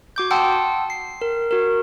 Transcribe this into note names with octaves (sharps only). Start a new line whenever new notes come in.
F#4 D6 G6
F#5 G5 A5 C6 D#6 E6
C7
A#4
F#4 A#4